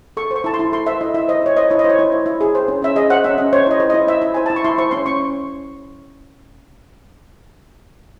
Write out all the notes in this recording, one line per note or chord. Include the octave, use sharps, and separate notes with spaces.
A4 C#6
C5 C#6
E4 A5
C6
E4
A4 C6
C5 E5
E4 D#5
E4 E5
C5 D#5
E4 C#5
C5 D#5
E4 C#5
D#5
C5
C#5
E4
C5
E4
G#4
C5
C#4
C#4 E5
G#4 D#5
C5 F#5
C#4 E5
C#4 D#5
C5 C#5
E4 D#5
C5
D#5
E4
C5 E5
E4
C5 G#5
A5
E4
C#6
E4 C6
C5 C#6
C#4 C6
C#4 C#6